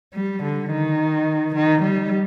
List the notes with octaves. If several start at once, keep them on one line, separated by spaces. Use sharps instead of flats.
G3
D3
D#3
D#3
G3